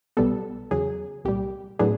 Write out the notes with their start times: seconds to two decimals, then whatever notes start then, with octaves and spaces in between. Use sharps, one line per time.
0.17 B1 B2 G3 B3 A4
0.71 E2 C#3 F#3 G#4
1.25 C2 A#2 G3 G4
1.79 A2 F#3 B3 D4 G#4